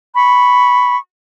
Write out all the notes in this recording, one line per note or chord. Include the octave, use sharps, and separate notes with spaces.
B5 C#6